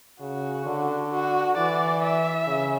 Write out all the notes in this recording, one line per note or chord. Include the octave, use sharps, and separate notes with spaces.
C#3 F#4
D3
F#4
E3 D5
E5
C#3